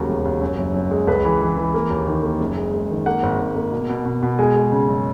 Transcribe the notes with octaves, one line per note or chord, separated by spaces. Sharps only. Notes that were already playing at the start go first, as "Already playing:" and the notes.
Already playing: D#2 C#3 F#3 A#4
E1
D#2
F#2
F#1
F#2
G#3
C#2 B4
E3
E3
E3
A#3
D#2
D#3
A#3
F#1
G#3
G#3
D#3
A#3 F#5
G#1
G#1
A#3
B2
B2
B2
B2
G#3 G#5
G#3
C#3
F#2